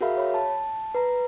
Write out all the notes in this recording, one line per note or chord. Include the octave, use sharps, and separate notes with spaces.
F#4 G#4 A#4 E5 F5 B5
C#5 B5
A5
B4 A#5